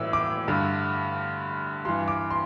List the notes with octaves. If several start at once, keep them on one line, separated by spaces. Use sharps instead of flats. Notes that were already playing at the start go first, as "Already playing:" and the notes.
Already playing: A2 E3 E6
D6
G2 D3
G2 E3 C6
D6
C6